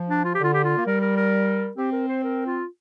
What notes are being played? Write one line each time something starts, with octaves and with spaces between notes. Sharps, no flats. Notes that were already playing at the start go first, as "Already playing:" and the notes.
Already playing: F3
D4
F4
G4
D3 F4
G4
F4
A#3
G3 A#4
A#4
A#4
C4 G4
A#4
C5
A#4
F4